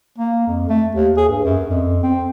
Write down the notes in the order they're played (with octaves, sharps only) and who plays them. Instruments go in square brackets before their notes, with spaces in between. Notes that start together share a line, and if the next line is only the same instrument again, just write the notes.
[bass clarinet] A#3
F2
A3
D#2
G#4
G2
F#2
F2
C4